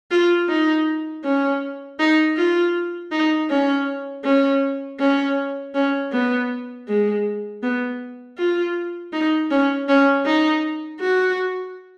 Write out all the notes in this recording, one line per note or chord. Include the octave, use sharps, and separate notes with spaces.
F4
D#4
C#4
D#4
F4
D#4
C#4
C#4
C#4
C#4
B3
G#3
B3
F4
D#4
C#4
C#4
D#4
F#4